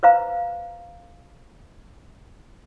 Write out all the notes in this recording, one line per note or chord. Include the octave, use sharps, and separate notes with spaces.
B4 C5 F5 A#5